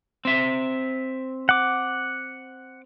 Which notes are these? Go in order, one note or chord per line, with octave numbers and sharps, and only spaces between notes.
C4 E5
F#5 D6